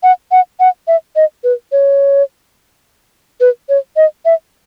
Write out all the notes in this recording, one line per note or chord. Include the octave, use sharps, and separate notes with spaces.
F#5
F#5
F#5
E5
D#5
B4
C#5
B4
C#5
D#5
E5